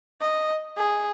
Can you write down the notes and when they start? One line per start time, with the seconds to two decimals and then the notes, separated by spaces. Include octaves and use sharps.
0.21 D#5
0.77 G#4